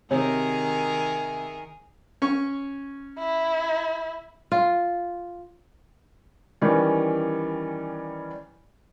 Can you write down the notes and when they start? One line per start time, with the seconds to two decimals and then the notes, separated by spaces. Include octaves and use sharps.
0.11 C3 D#3 G#4 A#4 C#5 G#5
2.22 C#4 C#6
3.19 E4
4.52 F4
6.61 D#3 E3 G3 C#4